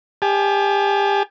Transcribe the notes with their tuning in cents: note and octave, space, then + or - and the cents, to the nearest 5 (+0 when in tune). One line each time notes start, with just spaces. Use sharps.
G4 +30 G#5 +45